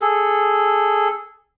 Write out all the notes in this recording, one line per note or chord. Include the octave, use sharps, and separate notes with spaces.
G#4 A4